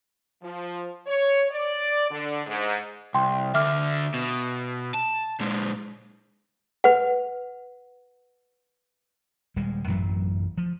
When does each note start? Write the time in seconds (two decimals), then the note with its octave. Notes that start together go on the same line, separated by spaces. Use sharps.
0.42 F3
1.07 C#5
1.50 D5
2.10 D3
2.46 G#2
3.14 C2 G5 C6
3.54 D2 D3 E5 D6 F6
4.14 B2
4.94 A5
5.40 A#2 G#3
6.84 B4 F#5
9.56 D#1 G3 G#3
9.88 A1 F#2 A2 F#3
10.58 F3